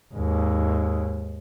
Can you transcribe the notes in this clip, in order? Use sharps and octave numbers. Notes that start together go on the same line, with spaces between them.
D#2 G#2